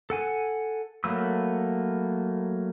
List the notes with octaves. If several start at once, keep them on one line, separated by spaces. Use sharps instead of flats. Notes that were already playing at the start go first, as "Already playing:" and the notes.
A4 F#5 G#5
F#3 A3 A#3 B4 E6